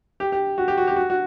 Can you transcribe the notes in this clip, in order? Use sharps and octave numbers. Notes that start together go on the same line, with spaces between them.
G4
G4
F#4
G4
F#4
G4
F#4
F#4